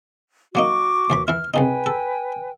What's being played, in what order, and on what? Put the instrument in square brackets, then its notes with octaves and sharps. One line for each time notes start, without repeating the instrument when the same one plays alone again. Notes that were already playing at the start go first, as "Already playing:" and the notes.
[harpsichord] F#3 A#3 D#4 [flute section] F#4 C#6 D6
[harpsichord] D#2 E3 B5
[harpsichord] E3 E4 [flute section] F6
[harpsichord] C2 C#3 D#4 [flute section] B4 G5 G#5
[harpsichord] A4